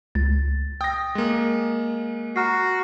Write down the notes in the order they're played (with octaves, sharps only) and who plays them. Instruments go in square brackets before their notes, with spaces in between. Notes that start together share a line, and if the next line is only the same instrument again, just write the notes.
[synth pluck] C#2 [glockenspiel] A6
[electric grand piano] G5 A#6 [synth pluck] D#6
[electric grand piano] G#3 A#3
[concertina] F#4 [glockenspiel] A#5 F6 C7